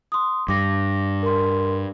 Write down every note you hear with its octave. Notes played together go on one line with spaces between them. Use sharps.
C6 D#6
G2 D6 A#6
A#4 C6